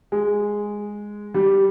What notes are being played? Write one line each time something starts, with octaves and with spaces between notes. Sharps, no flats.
G#3
G3